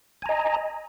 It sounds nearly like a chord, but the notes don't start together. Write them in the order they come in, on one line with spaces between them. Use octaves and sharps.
G#5 A#5 D#5